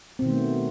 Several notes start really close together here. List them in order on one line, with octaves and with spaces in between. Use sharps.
C4 B2 D#3 B3 A3